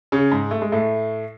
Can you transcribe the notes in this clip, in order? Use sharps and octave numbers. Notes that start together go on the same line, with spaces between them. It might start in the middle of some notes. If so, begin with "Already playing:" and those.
C#3 C#4
G#2 G#3
A3
G#3
A2 A3